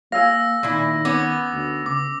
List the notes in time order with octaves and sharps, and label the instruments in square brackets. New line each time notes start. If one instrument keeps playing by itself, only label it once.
[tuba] A#3 [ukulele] G#4 F5 [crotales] E6 A#6
[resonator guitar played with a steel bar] A#2 E4 [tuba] D#3
[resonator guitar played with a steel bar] B3 C#4 [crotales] D6
[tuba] D2
[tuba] C#3 [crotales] D6